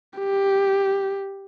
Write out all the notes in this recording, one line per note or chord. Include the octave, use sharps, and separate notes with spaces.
G4